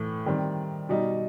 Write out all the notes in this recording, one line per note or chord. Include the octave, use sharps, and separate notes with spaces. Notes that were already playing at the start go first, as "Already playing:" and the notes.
Already playing: A2 E3 A3
D#3 G3 C4
B2 G3 D#4